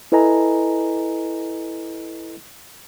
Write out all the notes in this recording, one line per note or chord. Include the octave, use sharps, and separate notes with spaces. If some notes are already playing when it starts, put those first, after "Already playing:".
E4 A4 B4 D#5 G#5 A#5